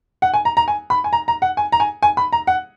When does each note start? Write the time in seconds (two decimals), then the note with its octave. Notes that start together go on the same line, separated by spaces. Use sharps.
0.22 F#5
0.34 G#5
0.45 A#5
0.57 A#5
0.68 G#5
0.90 B5
1.04 G#5
1.13 A#5
1.28 A#5
1.42 F#5
1.57 G#5
1.72 A#5
1.80 G#5
2.03 G#5
2.17 B5
2.33 A#5
2.47 F#5